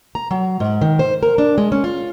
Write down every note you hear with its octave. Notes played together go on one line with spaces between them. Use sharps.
A#5
F#3
G#2
D#3
C5
A#4
D4
G#3
C#4
F4